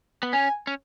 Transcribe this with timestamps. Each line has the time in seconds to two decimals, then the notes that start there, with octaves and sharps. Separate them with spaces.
0.23 B3
0.33 C#4 G#5
0.67 C#4